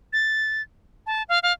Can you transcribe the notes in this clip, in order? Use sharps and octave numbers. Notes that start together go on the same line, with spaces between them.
A6
A5
F5
F5